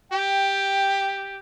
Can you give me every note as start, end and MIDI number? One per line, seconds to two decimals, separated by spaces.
0.12 1.40 67
0.12 1.21 79